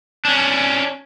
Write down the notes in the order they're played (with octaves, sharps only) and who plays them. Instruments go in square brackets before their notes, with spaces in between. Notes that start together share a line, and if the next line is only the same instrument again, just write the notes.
[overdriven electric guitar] C#4 D4